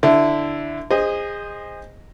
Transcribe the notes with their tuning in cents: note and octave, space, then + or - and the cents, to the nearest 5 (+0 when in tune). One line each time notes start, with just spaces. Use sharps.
D3 +0 E4 +0
G#4 -30 C5 +0 D#5 +0